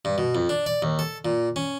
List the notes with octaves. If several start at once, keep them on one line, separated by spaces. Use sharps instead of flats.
G2
B2
F2
D4
D5
D#2
A4
A#2
C#4